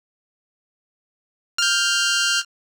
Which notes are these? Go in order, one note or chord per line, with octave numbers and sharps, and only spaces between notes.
F6 G6